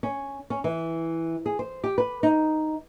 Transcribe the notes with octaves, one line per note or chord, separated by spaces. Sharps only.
C#4
C#4
E3
G#4
C5
G4
B4
D#4